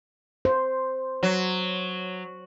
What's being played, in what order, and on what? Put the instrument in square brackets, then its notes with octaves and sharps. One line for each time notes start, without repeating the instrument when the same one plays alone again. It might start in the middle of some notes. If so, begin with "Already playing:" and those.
[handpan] C5
[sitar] F#3